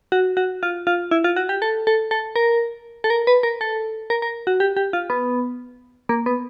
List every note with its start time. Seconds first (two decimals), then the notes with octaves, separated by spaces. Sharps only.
0.12 F#4
0.37 F#4
0.63 F4
0.87 F4
1.11 E4
1.24 F4
1.36 F#4
1.49 G4
1.62 A4
1.87 A4
2.11 A4
2.36 A#4
3.04 A4
3.10 A#4
3.27 B4
3.43 A#4
3.61 A4
4.10 A#4
4.22 A#4
4.47 F#4
4.60 G4
4.77 G4
4.93 F4
5.10 B3
6.09 A#3
6.26 B3